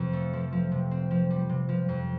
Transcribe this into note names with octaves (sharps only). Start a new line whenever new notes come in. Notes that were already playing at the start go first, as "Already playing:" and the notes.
Already playing: F2 C3 F3 C4
A3
F3
F3
C3
C4
F3
G3
C3
F3
F2